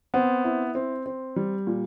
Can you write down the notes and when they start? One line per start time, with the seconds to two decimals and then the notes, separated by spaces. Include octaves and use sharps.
0.14 B3 C4
0.44 E4
0.75 C4
1.06 C4
1.36 G3
1.67 A#2